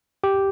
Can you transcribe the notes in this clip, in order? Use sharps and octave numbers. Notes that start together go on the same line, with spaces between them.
G4